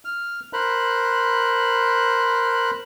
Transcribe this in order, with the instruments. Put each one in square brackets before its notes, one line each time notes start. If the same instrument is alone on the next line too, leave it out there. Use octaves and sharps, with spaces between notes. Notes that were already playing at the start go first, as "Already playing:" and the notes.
[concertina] F6
A#4 C5 B5 F#6